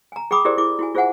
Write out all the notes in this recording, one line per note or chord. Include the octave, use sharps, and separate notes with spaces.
G#5 A#5
G#4 G5 B5 D6 D#6
E4 G4 G#4 A#4 C5 D5
E4 G#4 D6
E4 F#4 G#5
F4 G#4 C5 E5 F#5 G#5